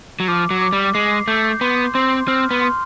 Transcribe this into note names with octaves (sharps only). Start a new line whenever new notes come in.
F#3
F3 D6
F#3
D6
G3
G#3 C7
A3 G6
B3 C6
C4 C6
C4 F6
B3
C6